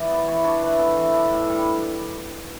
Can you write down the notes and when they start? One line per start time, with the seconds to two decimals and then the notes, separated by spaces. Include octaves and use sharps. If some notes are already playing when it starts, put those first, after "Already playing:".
Already playing: E3 D5
0.11 B3
0.27 E3 C#5
0.44 D4 C#5
0.62 E3 B4
0.79 B3 A4
0.96 E3
1.13 D4
1.31 A2
1.49 G3